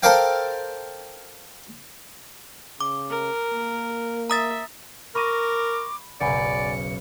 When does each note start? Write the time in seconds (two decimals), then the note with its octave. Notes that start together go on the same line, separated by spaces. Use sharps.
0.03 A4 A#4 C5 D5 F5 G5
2.81 C#3 D6
3.10 A#4
3.54 A#3
4.30 E5 A#5 D#6 A6
5.15 A#4 B5 C#6 D6 A#6 D#7
6.21 F#1 B1 D5 F#5 G#5 B5 C#7